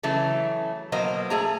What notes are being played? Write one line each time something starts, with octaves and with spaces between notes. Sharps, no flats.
C#3 E3 F#3 A3
B2 F#3 A#3 C5 D#5
A3 G#4 A#5